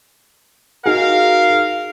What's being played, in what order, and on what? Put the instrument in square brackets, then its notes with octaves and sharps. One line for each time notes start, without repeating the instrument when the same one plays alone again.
[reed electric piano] D#4 F#4 G#4 [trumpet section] A#4 F5